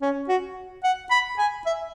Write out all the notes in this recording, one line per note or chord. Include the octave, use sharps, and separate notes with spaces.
C#4
F#4
F#5
B5
G#5
E5